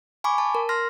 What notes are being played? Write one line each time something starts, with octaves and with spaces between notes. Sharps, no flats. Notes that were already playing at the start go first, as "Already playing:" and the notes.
G#5 B5 C#6 D6
A5
A#4
C6 F6 A#6